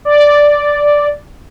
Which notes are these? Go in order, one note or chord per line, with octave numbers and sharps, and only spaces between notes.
D5